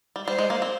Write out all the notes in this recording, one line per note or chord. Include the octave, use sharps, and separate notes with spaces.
G3
G3 C5
G#3
A#3
C4